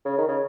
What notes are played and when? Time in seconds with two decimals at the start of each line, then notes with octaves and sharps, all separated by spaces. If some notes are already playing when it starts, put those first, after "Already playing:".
0.05 C#3
0.18 D#3
0.28 C#3